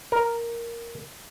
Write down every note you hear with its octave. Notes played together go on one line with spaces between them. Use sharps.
A#4